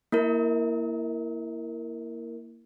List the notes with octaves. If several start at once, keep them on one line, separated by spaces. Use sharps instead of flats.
A#3 E4 A#4